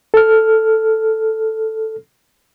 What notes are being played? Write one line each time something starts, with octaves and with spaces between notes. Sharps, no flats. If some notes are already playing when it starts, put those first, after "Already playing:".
A4 F6